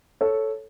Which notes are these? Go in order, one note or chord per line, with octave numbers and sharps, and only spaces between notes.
A4 C#5